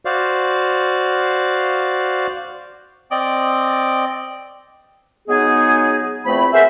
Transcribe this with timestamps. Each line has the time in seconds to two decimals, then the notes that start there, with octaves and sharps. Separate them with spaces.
0.05 F#4 C5 D5 F5
3.11 C4 D5 D#5
5.28 F#3 G#3 B3 D#4 G#4
6.25 E2 F3 A3 C4 B5
6.53 F#4 G#4 A#4 C5 E5